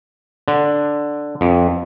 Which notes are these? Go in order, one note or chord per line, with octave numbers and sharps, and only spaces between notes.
D3
F2